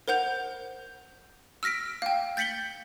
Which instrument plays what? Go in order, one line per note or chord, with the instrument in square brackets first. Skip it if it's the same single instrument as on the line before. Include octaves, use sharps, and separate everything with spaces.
[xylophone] A#4 C5 F#5 G6 F7
E6 F6 A#6 B6 D7
F5 G5
G6 A6 B6 C#7 F#7 G7